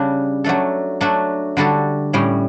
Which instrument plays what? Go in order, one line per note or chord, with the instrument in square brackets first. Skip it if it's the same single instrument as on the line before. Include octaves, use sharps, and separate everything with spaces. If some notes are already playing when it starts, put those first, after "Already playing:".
Already playing: [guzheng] C#3 G3 D4
F#3 A3 D4 A4
F#3 A3 D4 F#4 A4
D3 G3 D4 F#4 A4
A2 G3 C#4